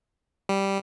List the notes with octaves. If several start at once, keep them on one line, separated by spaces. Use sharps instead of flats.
G3